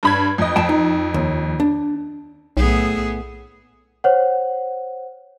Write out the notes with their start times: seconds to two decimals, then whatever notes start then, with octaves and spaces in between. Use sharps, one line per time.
0.03 G2 B5 G#6
0.38 F2 D#5
0.56 F2 G5 A5
0.69 D#4
1.14 D#2
1.60 D4
2.57 B1 A2 B3 G#4
4.04 C5 C#5 F#5